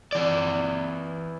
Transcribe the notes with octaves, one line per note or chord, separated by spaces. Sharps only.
E3 D5